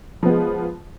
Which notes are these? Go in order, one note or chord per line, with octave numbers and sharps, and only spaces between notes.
F3 G#3 B3